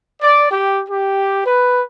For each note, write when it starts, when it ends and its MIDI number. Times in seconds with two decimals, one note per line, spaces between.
0.22 0.49 74
0.51 0.81 67
0.89 1.41 67
1.46 1.82 71